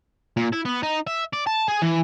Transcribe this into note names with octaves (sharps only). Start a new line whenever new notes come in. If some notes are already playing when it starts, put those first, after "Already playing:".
A#2
E4
B3
D#4
E5
D5
A5
G#4
E3